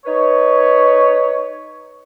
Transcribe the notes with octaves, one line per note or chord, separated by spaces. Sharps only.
D#4 B4 C#5